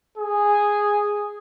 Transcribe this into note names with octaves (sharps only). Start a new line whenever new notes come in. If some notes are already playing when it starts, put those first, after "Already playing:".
G#4